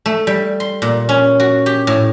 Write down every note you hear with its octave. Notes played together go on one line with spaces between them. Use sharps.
A3
G3
C6
A#2
C#4
F#4
G4
A2